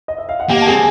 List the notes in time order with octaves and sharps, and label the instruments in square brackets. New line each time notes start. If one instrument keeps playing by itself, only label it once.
[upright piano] D#5
E5
F5
F#5
[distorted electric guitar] A#3 [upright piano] G4 G5
[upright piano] A5
[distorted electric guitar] C4 [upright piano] G#4 G#5